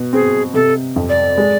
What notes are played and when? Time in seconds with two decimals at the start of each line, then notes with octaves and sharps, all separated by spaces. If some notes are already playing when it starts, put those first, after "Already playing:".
Already playing: B2
0.13 C4 G#4
0.54 C3 A4
0.96 F2
1.09 D5
1.38 G#3